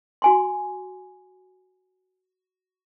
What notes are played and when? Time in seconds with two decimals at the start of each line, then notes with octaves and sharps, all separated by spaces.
0.22 F#4 G#5 C6